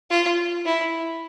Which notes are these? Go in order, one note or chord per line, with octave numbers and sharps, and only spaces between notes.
F4
E4